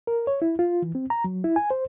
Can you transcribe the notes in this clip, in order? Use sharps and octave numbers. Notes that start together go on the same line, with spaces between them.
A#4
C#5
E4
F4
E3
C4
A#5
F#3
E4
G#5
C5